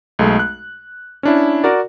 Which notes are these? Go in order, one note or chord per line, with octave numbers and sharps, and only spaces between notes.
B1 G#3 A3
F#6
C#4 D4 E4
F#4 A#4 D5